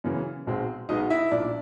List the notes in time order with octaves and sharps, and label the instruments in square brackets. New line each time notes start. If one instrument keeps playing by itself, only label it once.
[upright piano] F#2 C#3 E3
B1 B2 G#3 C4
B1 B2 G#3 B3 D#4 D#5
E4 E5
B1 A#2 F3 D4 D5